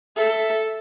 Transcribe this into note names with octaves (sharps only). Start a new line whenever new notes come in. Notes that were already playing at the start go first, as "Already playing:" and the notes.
A4 E5